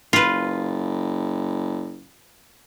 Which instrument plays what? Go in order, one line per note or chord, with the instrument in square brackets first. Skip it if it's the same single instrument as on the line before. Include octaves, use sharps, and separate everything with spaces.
[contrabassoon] F#1 [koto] F4 B4